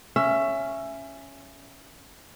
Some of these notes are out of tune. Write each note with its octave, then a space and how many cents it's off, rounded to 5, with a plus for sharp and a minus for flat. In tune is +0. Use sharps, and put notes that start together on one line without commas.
C#4 +0 E5 +20